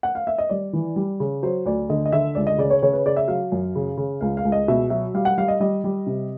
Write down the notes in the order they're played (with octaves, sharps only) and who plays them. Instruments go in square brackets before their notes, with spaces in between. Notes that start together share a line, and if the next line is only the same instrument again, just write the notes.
[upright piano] F#5
F5
E5
D#5
G3 D5
E3
G3
C#3
F#3 C5
D2 D5
D3 D#5
D#5
D3 E5
C#2 D5
D#5
C#3 D5
C#5
C#3 C#5
B4
C#3 D5
E5
F#3 F5
F#2
C#3
C#3
C#2 F5
F5
C#2
D#5
B2 E5
F#3 E5
G3 F5
F#5
G3 F5
D#5
G3 D#5
G3
C3